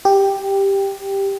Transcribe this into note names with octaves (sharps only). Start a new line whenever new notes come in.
G4